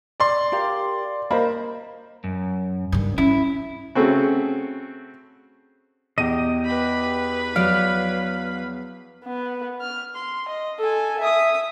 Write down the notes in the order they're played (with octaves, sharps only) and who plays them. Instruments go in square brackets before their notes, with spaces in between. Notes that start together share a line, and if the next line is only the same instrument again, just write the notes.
[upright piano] D5 C6
[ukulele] G4 A#4 F5
[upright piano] A#3 [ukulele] C5 D#5 B5
[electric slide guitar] F#2
[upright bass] G2 D#3
[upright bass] C#4 [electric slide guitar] E4
[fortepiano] C#3 A3 C4 F#4
[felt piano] E2 D#7 [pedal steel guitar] G4 D#5
[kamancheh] B4 B5
[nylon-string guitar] F#3 C#5 D5 [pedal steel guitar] F5
[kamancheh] B3
F6
C6
D#5
A4 G#5
E5 D#6